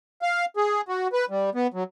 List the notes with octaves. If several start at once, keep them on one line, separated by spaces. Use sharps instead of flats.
F5
G#4
F#4
B4
G3
B3
F#3